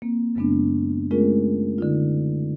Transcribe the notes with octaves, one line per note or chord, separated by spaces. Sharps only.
A#3 C4
F#2 C#3 G#3 B3 C4 D4
G#3 A3 C#4 F4 G#4 A#4
D3 D#4 F4